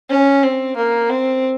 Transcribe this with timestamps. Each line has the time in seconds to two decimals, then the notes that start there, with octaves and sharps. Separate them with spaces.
0.10 C#4
0.43 C4
0.76 A#3
1.09 C4